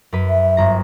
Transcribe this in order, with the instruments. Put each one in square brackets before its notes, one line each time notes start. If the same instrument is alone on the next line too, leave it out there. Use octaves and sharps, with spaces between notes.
[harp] F#2 B4
[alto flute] E5
[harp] G1 A#5